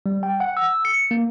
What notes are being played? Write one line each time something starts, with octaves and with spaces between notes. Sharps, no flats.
G3
G5
F#5
E6
C#7
A#3